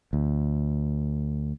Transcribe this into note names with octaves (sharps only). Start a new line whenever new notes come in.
D2